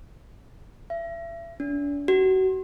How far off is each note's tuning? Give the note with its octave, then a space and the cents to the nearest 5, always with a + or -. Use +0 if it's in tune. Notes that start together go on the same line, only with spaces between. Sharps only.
E5 +35
D4 -35
F#4 +30